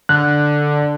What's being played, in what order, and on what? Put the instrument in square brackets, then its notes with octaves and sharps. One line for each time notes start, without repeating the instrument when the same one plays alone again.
[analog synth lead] D3 [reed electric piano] F#6